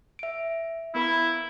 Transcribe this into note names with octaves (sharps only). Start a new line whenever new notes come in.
E5 D7
B3 E4 A#4 B5